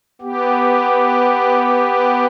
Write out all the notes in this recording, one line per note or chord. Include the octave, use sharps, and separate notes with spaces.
B3 G4